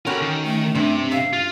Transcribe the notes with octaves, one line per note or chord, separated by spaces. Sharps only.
C#4 F#4 G4 A4 A#4 B5
D#3
A3
G2 C3 E5
E5 F5
F4